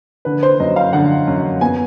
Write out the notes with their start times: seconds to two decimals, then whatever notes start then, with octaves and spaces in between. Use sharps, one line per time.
0.25 D3 B4
0.43 C5
0.60 F#2 D#5
0.76 F5
0.93 D3 F#5
1.28 F#2
1.61 B3 G#5